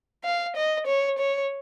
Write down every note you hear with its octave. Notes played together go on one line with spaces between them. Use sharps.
F5
D#5
C#5
C#5